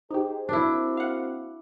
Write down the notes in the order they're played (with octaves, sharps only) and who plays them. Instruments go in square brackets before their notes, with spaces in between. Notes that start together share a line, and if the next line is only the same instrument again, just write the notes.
[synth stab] D#4 G4 [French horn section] G#4 C5
[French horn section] A#3 C4 F#4 [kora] D4 E4
[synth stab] F5 F#5